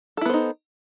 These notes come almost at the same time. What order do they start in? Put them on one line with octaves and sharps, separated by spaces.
A4 E4 B3 C5 D#4